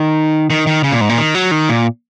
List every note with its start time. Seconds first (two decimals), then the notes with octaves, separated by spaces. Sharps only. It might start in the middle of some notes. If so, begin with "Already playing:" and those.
Already playing: D#3
0.50 D#3
0.67 D#3
0.84 C#3
0.92 A#2
1.01 G#2
1.09 A#2
1.17 D#3
1.35 F#3
1.51 D#3
1.69 A#2